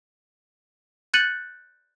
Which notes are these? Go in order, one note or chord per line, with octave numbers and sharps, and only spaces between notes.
F#6 G6 A6 C#7 D#7 F#7